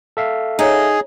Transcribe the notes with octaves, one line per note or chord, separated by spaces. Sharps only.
A4 E5 F5
D#4 G#4 C#5 A#5